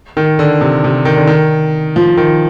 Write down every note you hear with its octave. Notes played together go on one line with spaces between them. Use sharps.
D#3
D3
C3
C3
D#3
D3
D#3
F3
D#3